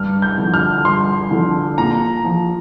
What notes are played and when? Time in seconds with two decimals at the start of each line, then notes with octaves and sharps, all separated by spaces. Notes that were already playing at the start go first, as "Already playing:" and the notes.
Already playing: G2 F6
0.22 G6
0.38 D3 F3
0.54 F6
0.85 G2 C6
1.31 D3 F3
1.78 A#2 A#5
2.24 F3